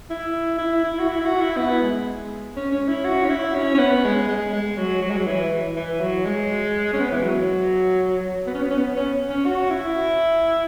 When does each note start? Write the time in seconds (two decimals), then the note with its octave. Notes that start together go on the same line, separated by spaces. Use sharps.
0.10 E4
0.58 E4
0.84 E4
0.99 F#4
1.08 E4
1.21 E4
1.25 F#4
1.41 E4
1.57 B3
1.82 G#3
2.56 C#4
2.72 C#4
2.88 E4
3.04 F#4
3.25 C#4
3.30 E4
3.55 C#4
3.74 C#4
3.78 B3
4.04 G#3
4.28 G#3
4.53 G#3
4.77 F#3
5.02 F#3
5.10 G#3
5.17 F#3
5.27 E3
5.76 E3
6.01 F#3
6.25 G#3
6.93 C#4
7.00 B3
7.12 E3
7.23 F#3
8.47 B3
8.54 C#4
8.62 B3
8.71 C#4
8.77 B3
8.96 C#4
9.29 C#4
9.45 F#4
9.70 E4